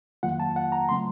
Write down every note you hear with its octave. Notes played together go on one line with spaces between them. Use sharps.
F2 D#3 F#3 A#3 F4 F#5
A5
F#5
A#5
C#3 F#3 A3 C4 C6